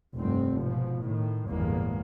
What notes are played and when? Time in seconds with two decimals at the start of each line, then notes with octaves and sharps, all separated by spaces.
0.16 F1 C2 G2 C4
0.58 G#2 B2 F3
1.01 A2 D#3
1.49 G1 E2 A2 G#3 A#3